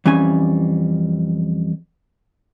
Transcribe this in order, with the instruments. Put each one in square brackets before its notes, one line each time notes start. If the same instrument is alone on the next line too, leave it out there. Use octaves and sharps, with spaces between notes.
[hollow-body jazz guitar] F2 E3 G3 C#4 G#5